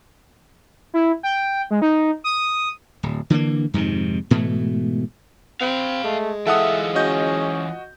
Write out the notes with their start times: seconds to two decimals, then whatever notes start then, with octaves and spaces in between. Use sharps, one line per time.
0.94 E4
1.23 G5
1.70 G#3
1.82 D#4
2.24 D#6
3.03 D1
3.30 D3 E3 A3 A#3
3.74 F2 G#2 C3 D#3
4.31 G#2 B2 E3 A3
5.61 C4 F5 B5
6.04 G#3 A3
6.47 E3 F4 A4 E5 F#5 D#6
6.96 C#4 F#4 D#5 G6